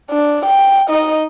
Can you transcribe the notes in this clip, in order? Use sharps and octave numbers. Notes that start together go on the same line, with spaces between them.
D4
G5
D#4 D#5